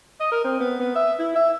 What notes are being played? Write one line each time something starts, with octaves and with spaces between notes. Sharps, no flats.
D#5
A#4
C4
B3
B3
E5
E4
E5